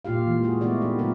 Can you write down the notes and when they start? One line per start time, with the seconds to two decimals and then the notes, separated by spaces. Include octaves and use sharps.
0.05 A#2 A#3 F4 G4 F5
0.27 E3 G#3
0.43 G#3 F#4 G#4
0.61 G3 A3 B3 E4 F#4 D5
0.82 D#4 G4
0.99 D3 F#3 A3 C4 F4 A#4